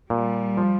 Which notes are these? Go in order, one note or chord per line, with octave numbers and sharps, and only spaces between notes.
A#2 G3
F3